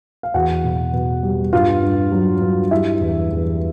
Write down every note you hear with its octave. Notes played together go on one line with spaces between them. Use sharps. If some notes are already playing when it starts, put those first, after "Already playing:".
F5
E2 F#4 F#5
B2
B2
G3
G2 F4 F5
G2
F#3
G2
G3 E4 E5
E2
E2